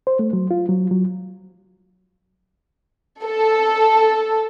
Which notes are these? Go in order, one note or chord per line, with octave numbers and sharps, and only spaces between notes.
C5
A3
F#3
F4
F#3
F#3
A4